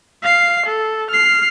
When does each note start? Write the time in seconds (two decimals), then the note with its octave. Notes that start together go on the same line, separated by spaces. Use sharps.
0.23 F5 C7
0.66 A4
1.10 F6 C7